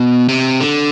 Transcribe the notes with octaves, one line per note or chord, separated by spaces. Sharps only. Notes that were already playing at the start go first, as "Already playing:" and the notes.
Already playing: B2
C3
D3